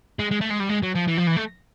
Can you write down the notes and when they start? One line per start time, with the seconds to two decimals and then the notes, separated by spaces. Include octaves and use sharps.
0.19 G#3
0.31 G#3
0.41 A3
0.51 G#3
0.60 G3
0.69 G#3
0.83 F#3
0.95 F3
1.07 E3
1.17 F3
1.27 E3
1.36 A3